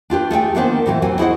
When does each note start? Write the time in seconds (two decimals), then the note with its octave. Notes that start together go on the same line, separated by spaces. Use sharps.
0.10 D4 F4 G4 B4
0.31 A3 G#4 F5 G5
0.55 D#3 A#3 B3 D4 A#4 C5
0.86 A2 C3 E3 F#3 A3 A#3
1.02 D#2 A2 F#3 C4 G#5
1.19 E4 G#4 A4 C5 D#5 F#5